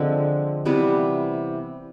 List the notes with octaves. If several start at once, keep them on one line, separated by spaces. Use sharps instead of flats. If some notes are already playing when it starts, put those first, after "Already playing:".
Already playing: D3 F3 G#3 C4
C3 E3 G3 B3